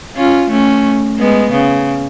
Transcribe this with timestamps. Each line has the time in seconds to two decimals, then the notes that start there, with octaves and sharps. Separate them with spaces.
0.16 C#4 F4
0.50 A3 C#4
1.18 G#3 B3
1.52 C#3